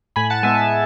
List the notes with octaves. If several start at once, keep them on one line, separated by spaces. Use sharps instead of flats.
A2 G#5 B5
F#5 A5
G#3 B3 E5 G#5